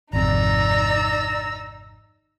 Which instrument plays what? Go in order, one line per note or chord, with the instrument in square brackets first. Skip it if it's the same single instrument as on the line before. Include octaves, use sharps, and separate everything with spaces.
[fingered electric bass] G#1 F2 C3 [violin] D#4 E6 [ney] D5 [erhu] A#5